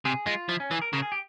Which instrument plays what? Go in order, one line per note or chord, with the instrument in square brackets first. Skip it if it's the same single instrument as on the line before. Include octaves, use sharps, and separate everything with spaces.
[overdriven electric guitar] C3 [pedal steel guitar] G#4
[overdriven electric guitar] G#3 [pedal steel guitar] F4
[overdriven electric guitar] F3 [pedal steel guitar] E4
[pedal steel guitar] C#4
[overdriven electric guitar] E3 [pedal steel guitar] G#4
[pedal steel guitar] A#4
[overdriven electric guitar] C#3 [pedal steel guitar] A#4
[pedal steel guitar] G#4
G4